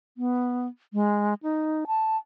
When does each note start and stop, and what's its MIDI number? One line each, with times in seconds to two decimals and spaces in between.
0.17 0.67 59
0.93 1.34 56
1.43 1.84 63
1.87 2.17 81